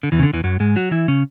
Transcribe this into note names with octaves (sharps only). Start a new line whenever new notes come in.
D3
E2 E3
C#3
D3
E2 E3
F#2 F#3
G#2 G#3
F#3 F#4
E3 E4
C#3 C#4